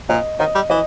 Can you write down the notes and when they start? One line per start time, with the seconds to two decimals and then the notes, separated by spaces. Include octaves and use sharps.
0.09 A#2 D#5
0.39 D#3 D#5
0.55 G3
0.70 E3 D#5